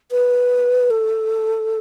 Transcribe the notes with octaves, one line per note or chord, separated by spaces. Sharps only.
B4
A4